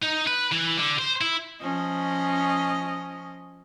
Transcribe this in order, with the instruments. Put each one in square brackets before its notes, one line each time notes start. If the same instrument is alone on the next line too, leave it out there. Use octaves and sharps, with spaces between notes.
[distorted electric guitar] D#4
B4
E3
D3
C5
E4
[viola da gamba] F3 C#4 D#5